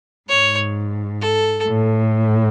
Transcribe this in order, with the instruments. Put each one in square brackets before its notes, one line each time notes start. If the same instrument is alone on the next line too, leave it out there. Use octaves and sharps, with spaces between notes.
[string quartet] G#2 [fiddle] C#5
[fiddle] A4
[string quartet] A2